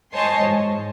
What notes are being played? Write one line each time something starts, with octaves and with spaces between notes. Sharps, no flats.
C5 C#5 D#5 G#5 A5 C6
G#2